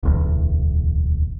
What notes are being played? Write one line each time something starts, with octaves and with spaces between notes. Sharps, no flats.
D1 B1 E2